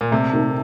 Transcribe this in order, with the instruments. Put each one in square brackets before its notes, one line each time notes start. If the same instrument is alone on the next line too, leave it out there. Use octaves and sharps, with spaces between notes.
[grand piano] A#2
[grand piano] C3 [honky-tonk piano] A3
[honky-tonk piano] D#3